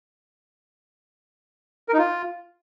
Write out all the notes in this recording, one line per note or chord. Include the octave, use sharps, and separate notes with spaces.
A#4
D#4
F4